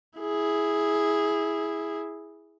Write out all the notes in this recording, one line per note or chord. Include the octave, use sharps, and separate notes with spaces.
E4 G#4